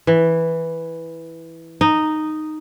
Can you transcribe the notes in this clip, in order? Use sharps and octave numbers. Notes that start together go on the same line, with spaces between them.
E3
D#4